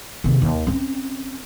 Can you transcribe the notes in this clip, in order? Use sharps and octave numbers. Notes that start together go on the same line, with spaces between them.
D#2 C3
D#2
C4 C#4